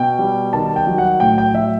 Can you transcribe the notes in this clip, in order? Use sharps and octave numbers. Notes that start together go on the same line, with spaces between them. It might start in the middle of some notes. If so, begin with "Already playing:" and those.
Already playing: B2 G5
G3
D#3 A5
G5
F#3
F#5
A2 G5
G5
F#3 E5